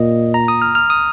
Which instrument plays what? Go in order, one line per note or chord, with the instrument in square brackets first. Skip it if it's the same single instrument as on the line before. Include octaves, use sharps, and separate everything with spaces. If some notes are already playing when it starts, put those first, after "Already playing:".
Already playing: [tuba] A#2 [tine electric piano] D#5
[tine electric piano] A#5
D#6
F6
F6
D#6